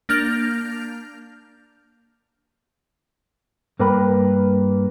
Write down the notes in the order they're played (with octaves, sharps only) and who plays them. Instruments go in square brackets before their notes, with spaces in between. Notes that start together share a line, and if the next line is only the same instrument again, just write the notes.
[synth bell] A#3 D4 F6 G6 F7
[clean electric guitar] G2 A#3 A#4 B4 G5 B5